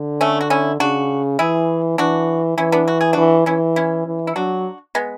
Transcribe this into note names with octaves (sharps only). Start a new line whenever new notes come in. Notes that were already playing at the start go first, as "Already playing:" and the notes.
Already playing: D3
A3 C#4
F#4
C#4 E4
C#3 D4 F#4
E3 E4 G#4
E3 D4 F#4
E3 C#4 E4
B3 D4
F#4
G#4
E3 D4 F#4
E3 C#4 E4
C#4 E4
E3
E4
F#3 D4 F#4
G#3 B3